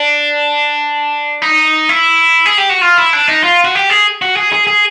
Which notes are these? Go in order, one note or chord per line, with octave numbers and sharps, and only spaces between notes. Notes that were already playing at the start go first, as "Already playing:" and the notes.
Already playing: D4
D#4
E4
G#4
G4
F#4
F4
E4
D4
D#4
F4
F#4
G4
G#4
F#4
G#4
G#4
G#4